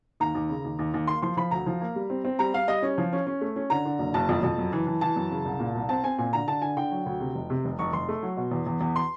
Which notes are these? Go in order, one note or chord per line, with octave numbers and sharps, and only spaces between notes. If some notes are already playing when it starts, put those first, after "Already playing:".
D#2 A#5
D#2
C#3
D#2
D#2
D#2
A#3 C6
F3 C6
F3 B5
D2 A#5
F3
A#3
G3
C4
C4
G3 A#5
G3 F5
G3 D#5
C#4
F3
C#4
C#4
A3
C#4
D3 A#5
D3
F#1
F#1 A5
F2
F2
F#2
E3
E3
E3 A5
F#2
C#3
C2
A#2
C2
C4 A5
C4 G#5
A#2 G#5
D3 A#5
D3 A5
D3 G#5
D3 G5
F#3
D2
C3
F1
C3
F1
F1 C#6
F1 C6
A3
F#3
B2
E2
E2
E2
C6